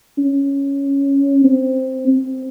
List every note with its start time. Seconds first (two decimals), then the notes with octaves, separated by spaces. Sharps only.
0.18 C#4
1.44 C4
2.07 C4